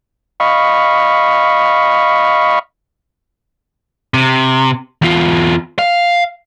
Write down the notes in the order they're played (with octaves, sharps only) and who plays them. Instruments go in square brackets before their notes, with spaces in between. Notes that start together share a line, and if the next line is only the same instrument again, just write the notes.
[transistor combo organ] D#5 F5 B5 C#6
[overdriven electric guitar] C3
E2 F4
F5